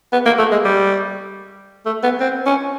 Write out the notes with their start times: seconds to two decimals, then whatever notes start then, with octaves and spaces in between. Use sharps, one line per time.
0.13 B3
0.26 A#3
0.39 A3
0.52 G#3
0.65 G3
1.86 A3
2.03 B3
2.20 C4
2.46 C#4